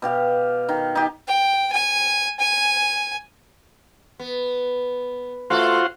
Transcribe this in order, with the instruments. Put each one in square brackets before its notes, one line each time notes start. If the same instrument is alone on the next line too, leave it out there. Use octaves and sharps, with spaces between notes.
[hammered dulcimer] B2 G4 F5
D#3
D#4 G4
[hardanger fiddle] G5
G#5
G#5
[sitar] B3
[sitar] A3 A4 [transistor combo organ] F4 F#4 C5